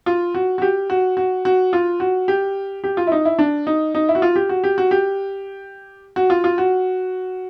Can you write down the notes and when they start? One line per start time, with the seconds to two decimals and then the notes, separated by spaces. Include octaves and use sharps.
0.06 F4
0.35 F#4
0.58 F#4
0.62 G4
0.90 F#4
1.17 F#4
1.45 F#4
1.73 F4
2.00 F#4
2.28 G4
2.84 G4
2.97 F4
3.07 E4
3.12 D#4
3.25 E4
3.39 D4
3.67 D#4
3.95 D#4
4.09 E4
4.15 F#4
4.22 F4
4.36 G4
4.49 F#4
4.64 G4
4.78 F#4
4.91 G4
6.16 F#4
6.30 F4
6.44 F4
6.58 F#4